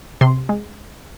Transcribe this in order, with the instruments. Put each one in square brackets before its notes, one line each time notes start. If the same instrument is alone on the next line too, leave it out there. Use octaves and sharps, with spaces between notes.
[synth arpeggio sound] C3 C6
G#3